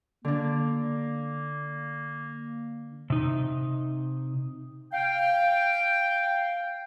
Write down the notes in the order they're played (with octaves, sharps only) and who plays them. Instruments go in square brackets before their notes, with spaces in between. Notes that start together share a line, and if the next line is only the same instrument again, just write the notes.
[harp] D3 D4 [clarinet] A#3
[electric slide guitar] C3 D#4
[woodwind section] F5 G5